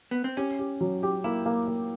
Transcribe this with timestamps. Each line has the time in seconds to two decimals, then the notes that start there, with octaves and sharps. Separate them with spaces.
0.11 B3
0.24 C4
0.37 C#4 G4
0.59 G4
0.81 F#3
1.03 G4
1.24 A#3 E4
1.46 A#3
1.68 A#3